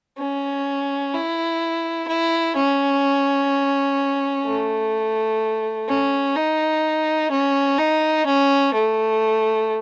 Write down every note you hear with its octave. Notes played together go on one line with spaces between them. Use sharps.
C#4
E4
E4
C#4
A3
C#4
D#4
C#4
D#4
C#4
A3